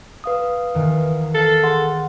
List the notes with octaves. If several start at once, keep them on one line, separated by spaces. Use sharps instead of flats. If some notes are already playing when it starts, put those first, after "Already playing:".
B4 F5 D#6
E2 D#3
A4 F5
G#4 F#5 C6